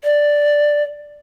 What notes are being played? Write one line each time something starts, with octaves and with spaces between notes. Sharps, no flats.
D5